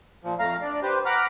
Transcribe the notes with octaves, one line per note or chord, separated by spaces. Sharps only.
A#2 F3
F2 A3 F5 A#5
D4 D5
G4 B4 C5
F#5 A#5 B5 D6 F6